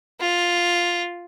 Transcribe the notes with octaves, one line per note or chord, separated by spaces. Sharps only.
F4